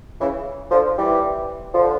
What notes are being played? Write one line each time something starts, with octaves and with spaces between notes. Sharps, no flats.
C#3 E3
D3 F3
E3 G3
D3 F3